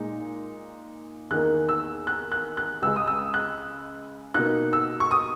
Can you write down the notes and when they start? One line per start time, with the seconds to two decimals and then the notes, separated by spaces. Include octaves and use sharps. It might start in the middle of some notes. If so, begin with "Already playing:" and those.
Already playing: A#2 G#3 D#4
1.30 E2 D#3 A#3 D#4 F#6
1.69 E6
2.07 F#6
2.32 F#6
2.57 F#6
2.82 C#2 C#3 G#3 E6
2.96 D#6
3.07 E6
3.34 F#6
4.34 B2 A#3 D#4 F#6
4.73 E6
5.00 C#6
5.11 D#6